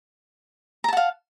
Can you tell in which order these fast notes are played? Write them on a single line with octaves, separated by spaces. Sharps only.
A#5 A5 F#5 F5